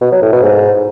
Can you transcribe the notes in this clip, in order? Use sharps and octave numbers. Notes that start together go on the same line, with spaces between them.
B2
F#3
A2
B2
G#2